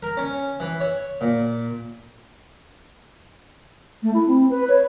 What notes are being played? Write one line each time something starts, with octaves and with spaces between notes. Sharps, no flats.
A#4
C#4
E3
C#5
A#2
A3
E4
C4
B4
C#5